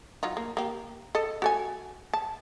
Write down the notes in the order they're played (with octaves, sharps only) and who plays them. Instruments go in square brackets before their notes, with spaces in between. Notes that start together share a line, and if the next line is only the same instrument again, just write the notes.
[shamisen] F#3 D#4 F4
A#3
A#3 G4
A4 D#5
F#4 A4 G#5
A5